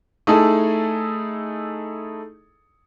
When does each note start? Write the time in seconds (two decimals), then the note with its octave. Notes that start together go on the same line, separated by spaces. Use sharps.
0.27 A3 D#4 E4 G#4 A4